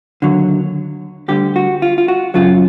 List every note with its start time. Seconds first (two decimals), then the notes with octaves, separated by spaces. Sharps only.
0.22 D#2 D3 F#3
1.28 D2 D3 G3 G4
1.56 F#4
1.82 F4
1.98 F4
2.08 F#4
2.34 F#2 C#3 F#3 F4